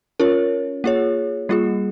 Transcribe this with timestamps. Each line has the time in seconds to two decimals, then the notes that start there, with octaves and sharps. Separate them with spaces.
0.20 C#4 F4 A#4 C#5
0.84 A#3 F4 G#4 C#5
1.49 G3 A#3 F4 G#4